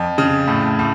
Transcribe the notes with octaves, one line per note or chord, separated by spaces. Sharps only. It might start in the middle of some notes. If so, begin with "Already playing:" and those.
Already playing: F2
C#3
A2
A2